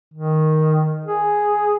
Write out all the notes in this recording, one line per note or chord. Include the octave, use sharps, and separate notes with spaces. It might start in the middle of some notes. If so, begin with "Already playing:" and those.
D#3
G#4